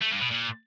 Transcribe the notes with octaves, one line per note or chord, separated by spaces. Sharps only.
A3
G2
B2
A#2